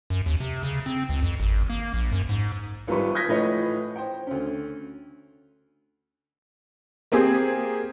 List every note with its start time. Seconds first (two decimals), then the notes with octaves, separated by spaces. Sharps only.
0.10 F#2
0.26 D#2
0.40 C3
0.63 C#3
0.86 C4
1.09 C#2
1.23 F2
1.40 G#1
1.70 A#3
1.94 A#1
2.12 F#2
2.29 G#2
2.88 G#1 E3 F3 G3 B4 C#6
3.15 D#6 G6 G#6 A#6 B6
3.28 A2 E3 F3 B4 C#5 D#5
3.96 C5 G5
4.27 D2 C#4
7.12 A#3 C4 G4 G#4